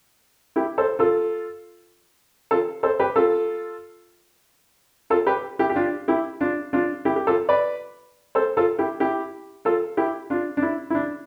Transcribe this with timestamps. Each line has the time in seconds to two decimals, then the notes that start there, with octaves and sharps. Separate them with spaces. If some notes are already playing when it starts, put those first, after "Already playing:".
0.56 E4 G4
0.78 A4 C5
0.99 F4 A4
2.51 F4 A4
2.83 A4 C5
3.00 G4 B4
3.16 F4 A4
5.10 F4 A4
5.27 G4 B4
5.59 E4 G4
5.70 G4
5.76 D4 F4
6.08 E4 G4
6.40 D4 F4
6.73 D4 F4
7.05 E4 G4
7.16 G4
7.27 F4 A4
7.49 B4 D5
8.35 A4 C5
8.57 F4 A4
8.79 E4 G4
9.00 E4 G4
9.65 F4 A4
9.97 E4 G4
10.30 D4 F4
10.57 D4
10.62 E4
10.90 E4
10.95 D4